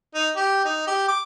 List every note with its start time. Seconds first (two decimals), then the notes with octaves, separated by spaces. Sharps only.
0.15 D#4
0.36 G4
0.65 D#4
0.87 G4
1.08 D6